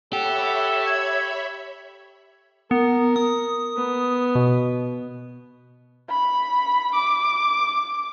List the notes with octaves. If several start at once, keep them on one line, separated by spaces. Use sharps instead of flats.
G4 A4 C#5 E5 F#5 B5
G#6
B3 A#4
D#6
B3
B2
B5
D6